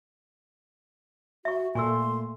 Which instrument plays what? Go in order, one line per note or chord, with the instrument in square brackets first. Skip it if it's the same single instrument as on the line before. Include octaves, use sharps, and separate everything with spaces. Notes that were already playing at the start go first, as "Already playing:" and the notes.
[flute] F#4 [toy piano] E5 C#6
[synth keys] A#2 A3 [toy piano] G#5 C#6 E6 [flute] C6